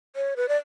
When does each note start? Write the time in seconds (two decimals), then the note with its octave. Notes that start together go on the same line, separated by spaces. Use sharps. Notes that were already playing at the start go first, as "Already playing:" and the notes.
0.16 C#5
0.37 B4
0.48 D5